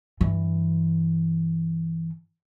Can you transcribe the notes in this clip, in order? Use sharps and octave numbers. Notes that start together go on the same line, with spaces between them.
G2 E3